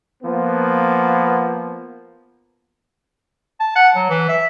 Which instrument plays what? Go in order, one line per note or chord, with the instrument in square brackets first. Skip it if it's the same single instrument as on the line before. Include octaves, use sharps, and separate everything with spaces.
[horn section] F3 A#3 B3
[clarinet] A5
F#5
F#3
E3
E5